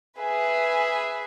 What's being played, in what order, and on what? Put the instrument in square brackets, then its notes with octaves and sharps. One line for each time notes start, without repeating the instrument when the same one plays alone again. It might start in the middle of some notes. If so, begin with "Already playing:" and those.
[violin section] G#4 B4 E5